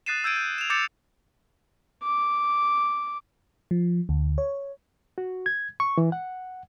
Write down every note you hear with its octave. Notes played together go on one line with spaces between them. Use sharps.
D#6 F#6 A6 C7 D#7 E7
E6 G6 G#6 D7 D#7
G6
E7 F7
D6 G6 A6 C#7 E7 F7
D6
F3
D2
C#5
F#4
G#6
C#6
E3
F#5